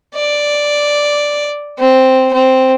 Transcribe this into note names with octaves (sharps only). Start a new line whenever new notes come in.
D5
C4
C4